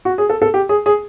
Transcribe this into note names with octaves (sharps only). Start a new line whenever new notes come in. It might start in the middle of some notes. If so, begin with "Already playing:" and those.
F#4
G#4
A4
A4
G4
G#4
G#4